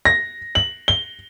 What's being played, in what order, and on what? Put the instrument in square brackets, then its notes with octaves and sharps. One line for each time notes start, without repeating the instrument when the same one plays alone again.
[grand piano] A#6
F#7
G7